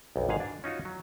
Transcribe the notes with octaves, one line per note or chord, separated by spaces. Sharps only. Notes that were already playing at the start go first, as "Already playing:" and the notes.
B1 F2
G#1 G#2 G#4 F5 G#5
D4
C#4 D#4 F4 F#4
F#3